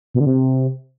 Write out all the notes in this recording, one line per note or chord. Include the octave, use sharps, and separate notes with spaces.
B2
D3
C3